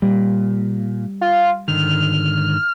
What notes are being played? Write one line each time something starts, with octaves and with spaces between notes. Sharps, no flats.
A#2 G3
F4
G#2 D3 D#3 F6